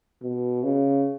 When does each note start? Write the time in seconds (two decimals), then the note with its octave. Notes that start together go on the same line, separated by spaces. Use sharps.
0.23 B2
0.64 C#3